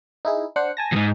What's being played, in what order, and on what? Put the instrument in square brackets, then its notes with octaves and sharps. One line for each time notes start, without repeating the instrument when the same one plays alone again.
[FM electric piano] D#4 E4 G#4
D4 C5 F#5
G#5 A5 A#6
[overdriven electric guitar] E2 G#2 [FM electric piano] D#6